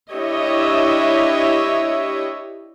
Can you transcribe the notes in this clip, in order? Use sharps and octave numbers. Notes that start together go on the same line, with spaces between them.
D4 E4 G4 C#5 D#5 E5